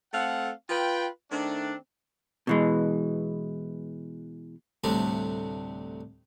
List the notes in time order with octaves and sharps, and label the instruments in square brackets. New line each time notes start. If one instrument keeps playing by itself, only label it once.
[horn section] A3 C4 A4 F5 F#5
F4 B4 G5
D#3 A3 C4 D4
[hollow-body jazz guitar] B2 E3 G#3
[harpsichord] D2 A2 C3 G3 C4 D4